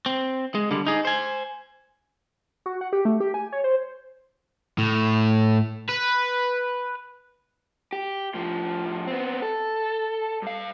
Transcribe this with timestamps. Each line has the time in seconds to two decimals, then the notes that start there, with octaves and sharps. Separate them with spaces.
0.06 C4
0.55 G#3
0.71 D3 G3
0.87 D#4 G#4
1.05 C5 G#5
2.66 F#4
2.81 F#5
2.93 G4
3.05 A3
3.20 G4
3.34 G#5
3.52 C#5
3.64 C5
4.78 A2
5.89 B4
7.93 G4
8.34 A2 F3
9.07 B3 C4
9.42 A4
10.42 G2 F5